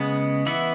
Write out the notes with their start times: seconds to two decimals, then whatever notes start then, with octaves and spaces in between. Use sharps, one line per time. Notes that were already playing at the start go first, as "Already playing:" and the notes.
Already playing: C#3 G#3 B3 F#5
0.46 E3 B3 E4 F#5